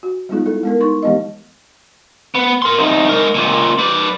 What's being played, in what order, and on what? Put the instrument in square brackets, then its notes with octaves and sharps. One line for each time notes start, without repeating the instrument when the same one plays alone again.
[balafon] F#4
G3 G#3 B3 D#4 F4 G#4
E4 A4
G#3 B3 A#4
D#4 C6 C#6
E3 G#3 B3 G4 D#5
[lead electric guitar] B3
A#4 C6
C2 D#4
G#3 A#4
C#2 A#2
B4 D5